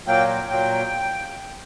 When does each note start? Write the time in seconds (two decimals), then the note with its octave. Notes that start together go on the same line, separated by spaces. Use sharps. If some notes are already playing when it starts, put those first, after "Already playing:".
0.07 A#2 F#3 A#3 G5
0.28 G5
0.49 A#2 F#3 A#3 G5